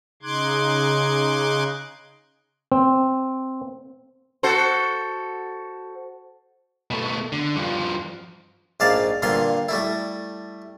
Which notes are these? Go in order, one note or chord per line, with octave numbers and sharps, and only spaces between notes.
C#3 D#4 C6 D6 F#6 G#6
C4
F#4 A4 C5
B2 A3
D3
G2 F3
A#1 G#2 D5 F5 A5
G2 A#2 D3 F5 C6
G3 A3 E4